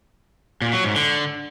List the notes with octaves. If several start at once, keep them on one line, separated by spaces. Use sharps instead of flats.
A#2
F#3
G#2
D3